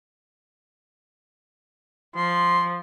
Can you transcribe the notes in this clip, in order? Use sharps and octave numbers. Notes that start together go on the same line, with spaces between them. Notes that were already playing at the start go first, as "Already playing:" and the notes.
F3 C6